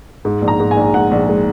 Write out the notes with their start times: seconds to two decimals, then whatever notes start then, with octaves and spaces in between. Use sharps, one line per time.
0.25 G#2
0.42 A#1
0.48 A#5
0.60 G#2
0.71 G#5
0.77 A#1
0.94 G#2 F#5
1.11 A#1
1.29 G#3